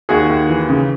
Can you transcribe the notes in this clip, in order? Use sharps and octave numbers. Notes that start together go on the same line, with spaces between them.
D#2 F#4 G#4
D#2
E3
C#3